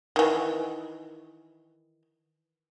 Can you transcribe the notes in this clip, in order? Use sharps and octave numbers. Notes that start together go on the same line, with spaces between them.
D#3 E3